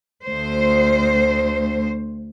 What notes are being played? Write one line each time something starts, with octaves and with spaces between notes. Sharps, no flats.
D2 C5